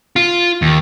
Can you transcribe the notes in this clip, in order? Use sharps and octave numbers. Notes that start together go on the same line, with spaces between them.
F4
D#2